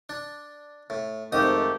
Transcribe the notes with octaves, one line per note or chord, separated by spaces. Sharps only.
D4
A2
F2 G#2 D#3 A3 G4 D#6